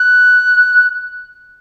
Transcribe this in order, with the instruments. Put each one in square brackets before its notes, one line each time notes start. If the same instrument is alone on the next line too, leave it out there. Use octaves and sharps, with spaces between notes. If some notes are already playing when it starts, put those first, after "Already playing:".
Already playing: [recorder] F#6